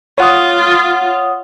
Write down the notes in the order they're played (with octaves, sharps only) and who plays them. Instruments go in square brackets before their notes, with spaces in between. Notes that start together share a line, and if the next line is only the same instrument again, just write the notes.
[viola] F4 [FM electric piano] C#5 F#5 D#6